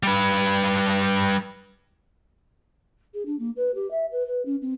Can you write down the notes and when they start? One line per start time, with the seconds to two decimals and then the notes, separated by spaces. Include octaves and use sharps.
0.03 G3 B4
3.13 G#4
3.25 D4
3.39 A#3
3.56 B4
3.74 G4
3.90 E5
4.11 B4
4.26 B4
4.45 C#4
4.61 C4